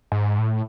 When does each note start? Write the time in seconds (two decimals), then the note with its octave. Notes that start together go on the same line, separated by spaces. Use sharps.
0.12 G#2
0.38 A2